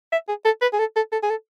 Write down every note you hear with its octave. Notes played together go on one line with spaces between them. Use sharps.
E5
G#4
A4
B4
G#4
A4
A4
A4
G#4
A4